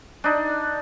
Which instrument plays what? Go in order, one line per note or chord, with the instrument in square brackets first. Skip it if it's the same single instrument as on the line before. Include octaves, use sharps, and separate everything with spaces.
[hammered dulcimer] D4 D#4